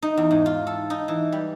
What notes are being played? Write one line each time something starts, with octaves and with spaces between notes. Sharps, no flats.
D#4
E2
G#2
F4
A4
D#4
E3
G3